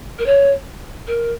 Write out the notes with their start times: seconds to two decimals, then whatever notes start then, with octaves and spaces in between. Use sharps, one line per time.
0.18 A#4
0.26 C#5
1.07 A#4